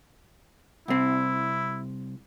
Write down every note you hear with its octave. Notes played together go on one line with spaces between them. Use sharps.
C2 C4 E4